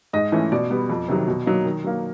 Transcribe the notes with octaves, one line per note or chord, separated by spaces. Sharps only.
G#2 D#5
E3 A3 C#4
B2 D5
G3 B3
F2
C3 D#3 F#3
B2
F#3 A#3 D#4
D#3
F#3 A#3